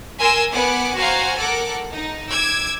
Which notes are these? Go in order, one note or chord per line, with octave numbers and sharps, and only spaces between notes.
A#4 G#5 C6 E6
B3 F#5 G#5 D6
F#4 C5 F5 G#5 A#5
A4 A#4 F#5 D6
D#4
D6 E6 G#6